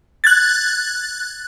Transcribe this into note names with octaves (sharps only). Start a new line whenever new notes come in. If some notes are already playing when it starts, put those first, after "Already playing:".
F#6 G#6 A6